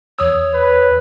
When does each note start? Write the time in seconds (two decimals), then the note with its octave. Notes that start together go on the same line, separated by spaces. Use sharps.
0.19 E2 C#5 D#6 E6
0.54 B4